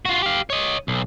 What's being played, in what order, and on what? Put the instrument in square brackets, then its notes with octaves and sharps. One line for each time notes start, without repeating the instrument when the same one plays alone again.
[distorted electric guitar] F4 F#4
G4 F5
C#5 D#5
B1